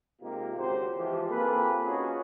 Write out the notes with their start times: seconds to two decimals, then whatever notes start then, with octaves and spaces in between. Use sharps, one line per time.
0.21 C3 G#3 A#3 D#4 F4 G4
0.56 G#1 C#2 F#4 G4 C5
0.96 E3 F3 G#3 G4
1.29 A#3 C4 F4 G#4 A4 B4
1.84 C#4 D#4 F4 F#4 G#4